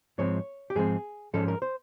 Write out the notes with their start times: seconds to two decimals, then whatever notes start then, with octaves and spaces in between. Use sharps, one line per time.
0.18 G#2 F3 G#3 C4 C#5
0.70 G4
0.75 G#2 F3 G#3 C4 G#4
1.33 G#2 F3 G#3 C#4 A4
1.48 A#4
1.62 C5